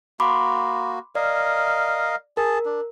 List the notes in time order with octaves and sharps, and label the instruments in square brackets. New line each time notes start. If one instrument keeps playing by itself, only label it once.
[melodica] A#3 F#4 [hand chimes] B5 C6 D6
[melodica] A#4 D#5 F5 [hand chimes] D5
[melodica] G#4 A5 [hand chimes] A#4
[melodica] D4